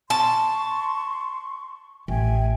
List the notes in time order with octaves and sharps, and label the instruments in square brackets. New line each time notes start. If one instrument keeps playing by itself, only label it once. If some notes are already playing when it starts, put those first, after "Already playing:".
[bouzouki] A5 [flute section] C6 C#6
[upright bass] A1 [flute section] E5 G5 G#5